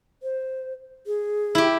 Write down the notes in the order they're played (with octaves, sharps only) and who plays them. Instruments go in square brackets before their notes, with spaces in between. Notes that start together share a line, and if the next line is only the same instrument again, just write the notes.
[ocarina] C5
G#4
[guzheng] E4 G4